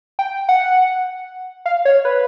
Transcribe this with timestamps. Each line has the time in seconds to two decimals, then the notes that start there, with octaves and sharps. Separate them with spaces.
0.19 G5
0.49 F#5
1.66 F5
1.85 C#5
2.05 B4